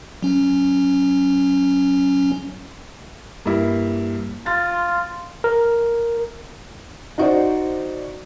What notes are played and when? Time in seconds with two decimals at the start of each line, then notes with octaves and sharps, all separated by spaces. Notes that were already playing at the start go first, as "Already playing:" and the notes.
0.23 F#3 C#4
3.46 G2 A#3 E4
4.46 F4 A6
5.44 A#4
7.18 D#4 F#4 C5 D5